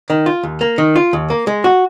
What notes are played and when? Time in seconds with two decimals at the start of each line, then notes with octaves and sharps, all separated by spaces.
0.10 D#3
0.26 F4
0.43 D#2
0.61 A#3
0.78 D#3
0.96 F4
1.13 D#2
1.30 A#3
1.47 G#3
1.64 F#4